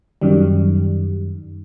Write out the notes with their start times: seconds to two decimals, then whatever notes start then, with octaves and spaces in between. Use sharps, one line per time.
0.21 F#2 D#3 G3